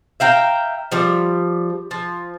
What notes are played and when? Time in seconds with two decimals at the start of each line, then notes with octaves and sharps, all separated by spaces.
0.20 E5 F5 G5 A#5
0.92 F3 G3
1.91 F3